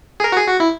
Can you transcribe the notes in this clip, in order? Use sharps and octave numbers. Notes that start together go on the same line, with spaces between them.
G#4
A#4
F#4
G#4
F#4
E4